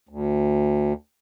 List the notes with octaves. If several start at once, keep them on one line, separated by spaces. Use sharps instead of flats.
D2